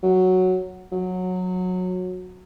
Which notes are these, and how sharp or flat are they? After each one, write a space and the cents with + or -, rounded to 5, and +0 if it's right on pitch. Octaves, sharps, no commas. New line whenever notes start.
F#3 +0
F#3 -15